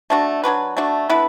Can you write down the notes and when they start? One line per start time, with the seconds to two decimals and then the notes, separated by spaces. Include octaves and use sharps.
0.10 A3 D4 F#4
0.44 F#3 D4 F#4 B4
0.77 A3 D4 F#4
1.09 D3 B3 E4 B4